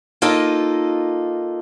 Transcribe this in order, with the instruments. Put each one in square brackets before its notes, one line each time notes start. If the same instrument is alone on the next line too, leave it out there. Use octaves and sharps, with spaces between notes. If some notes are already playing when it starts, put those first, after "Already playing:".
[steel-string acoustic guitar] A#3 D#4 F4 A4 D#5